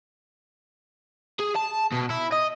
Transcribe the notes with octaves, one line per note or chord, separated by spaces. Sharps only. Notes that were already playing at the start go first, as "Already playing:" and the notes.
G#4
A5
B2
E4
D#5